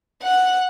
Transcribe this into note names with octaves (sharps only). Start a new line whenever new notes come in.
F#5